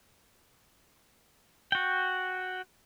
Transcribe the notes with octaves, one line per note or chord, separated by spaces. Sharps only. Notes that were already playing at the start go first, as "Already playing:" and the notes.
F#4 G5